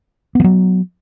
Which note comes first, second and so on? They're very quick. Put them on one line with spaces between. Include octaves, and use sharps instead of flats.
B3 F3 F#3